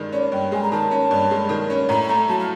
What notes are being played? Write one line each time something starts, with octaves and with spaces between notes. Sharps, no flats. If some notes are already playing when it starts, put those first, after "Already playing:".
Already playing: G2 D#3 G#3
C#4 D5
G2 G5
G#3 G#5
A#5
D#3 A5
C#4
G2
G#3
D#3
C#4
A2 A#5
B5
A3 A#5
F#3 A5
F5